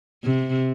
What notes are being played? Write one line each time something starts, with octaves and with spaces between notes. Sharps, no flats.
C3